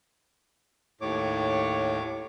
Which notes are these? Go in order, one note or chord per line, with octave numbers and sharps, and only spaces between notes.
D#2 A2 C#5 D6